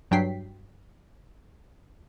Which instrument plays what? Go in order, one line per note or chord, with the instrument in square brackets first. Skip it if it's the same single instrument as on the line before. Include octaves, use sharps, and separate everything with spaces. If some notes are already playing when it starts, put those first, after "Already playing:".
[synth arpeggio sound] G2 F#3 D4 G5 B6 C7